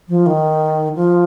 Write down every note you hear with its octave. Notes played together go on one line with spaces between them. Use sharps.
F3
D#3
F3